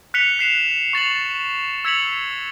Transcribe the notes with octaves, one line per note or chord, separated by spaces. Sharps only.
F#6 B6 C#7 F7 G7
F#6 C7 E7 F7
C#6 A6 F7 F#7
E6 G#6 B6 C#7 F7 F#7